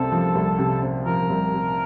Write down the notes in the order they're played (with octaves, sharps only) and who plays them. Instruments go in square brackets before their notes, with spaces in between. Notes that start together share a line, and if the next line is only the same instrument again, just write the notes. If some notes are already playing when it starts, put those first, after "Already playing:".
Already playing: [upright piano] C2 C3 C4 [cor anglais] A4
[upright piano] F3
C2
C3
C4
[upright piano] F3 [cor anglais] A#4
[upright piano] C2
C3